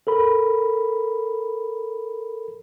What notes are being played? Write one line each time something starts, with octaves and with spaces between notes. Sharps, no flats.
A4 A#4 B5